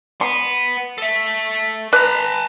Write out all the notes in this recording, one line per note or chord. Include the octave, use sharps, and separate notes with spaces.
B3 C6
A4 E5
B4 A5 A#5